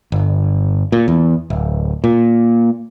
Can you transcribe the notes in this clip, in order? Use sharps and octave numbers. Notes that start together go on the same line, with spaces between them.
G1
A#2
E2
D1
A#2